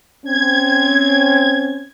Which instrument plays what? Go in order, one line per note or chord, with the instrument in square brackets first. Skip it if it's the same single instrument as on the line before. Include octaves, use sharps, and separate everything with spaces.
[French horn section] C4 C#4 [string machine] G#6